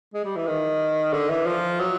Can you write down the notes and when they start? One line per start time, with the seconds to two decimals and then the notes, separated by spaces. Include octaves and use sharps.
0.14 G#3
0.25 G3
0.36 E3
0.47 D#3
1.13 D3
1.29 E3
1.46 F3
1.80 F#3